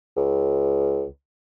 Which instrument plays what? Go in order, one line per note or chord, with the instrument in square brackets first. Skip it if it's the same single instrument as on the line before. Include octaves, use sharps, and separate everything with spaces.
[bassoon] C#2